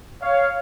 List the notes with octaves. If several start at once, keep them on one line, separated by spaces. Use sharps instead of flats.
C#5 F5